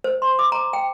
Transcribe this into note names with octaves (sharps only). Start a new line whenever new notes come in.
C5
C6
D6
A#5
G5